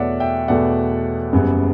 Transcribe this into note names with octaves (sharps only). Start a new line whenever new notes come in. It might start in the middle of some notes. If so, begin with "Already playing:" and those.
Already playing: E2 B2 A3 C#5 D5 E5 F#5
E5 G5
E2 B2 A3 D5 F#5
F#1 F#2 C#3 G3 B3